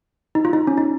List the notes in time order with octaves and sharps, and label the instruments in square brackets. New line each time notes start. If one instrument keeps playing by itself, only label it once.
[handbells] D#4
F4
D#4
C#4
D#4